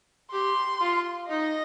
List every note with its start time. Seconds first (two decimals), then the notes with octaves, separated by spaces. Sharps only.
0.32 G4 C6
0.80 F4
1.29 D#4 D#5